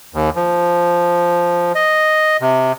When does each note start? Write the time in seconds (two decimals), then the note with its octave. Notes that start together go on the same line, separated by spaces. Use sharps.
0.14 D#2
0.36 F3
1.75 D#5
2.41 C3